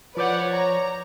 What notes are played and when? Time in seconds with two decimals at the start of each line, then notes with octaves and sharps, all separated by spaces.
0.17 F3 B4 C#5 D5 F#5 D6 G6
0.52 A#5